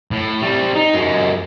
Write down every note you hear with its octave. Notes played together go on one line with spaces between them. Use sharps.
A2
G3 C4
D#4
F#2 G#3